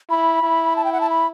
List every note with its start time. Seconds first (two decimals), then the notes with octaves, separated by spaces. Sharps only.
0.09 E4 B5
0.43 E4
0.76 A5
0.84 G5
0.92 F#5
1.01 A5
1.09 B5